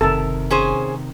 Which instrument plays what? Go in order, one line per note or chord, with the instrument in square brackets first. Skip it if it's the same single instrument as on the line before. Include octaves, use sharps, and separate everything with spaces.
[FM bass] F#1 [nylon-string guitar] C3 D#3 A#4 [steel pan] A4
[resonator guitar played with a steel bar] C#4 G#4 C5